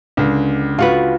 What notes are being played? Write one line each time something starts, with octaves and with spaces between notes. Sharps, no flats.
C#2 D3
F4 F#4 B4